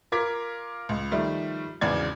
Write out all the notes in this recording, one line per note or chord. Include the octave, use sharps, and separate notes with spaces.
F4 A#4 D6 G#6 B6
C#2
D#3 F3 G3 A3
G#1 E2 C#3 D5 G#6